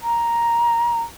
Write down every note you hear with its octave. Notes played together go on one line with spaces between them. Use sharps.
A#5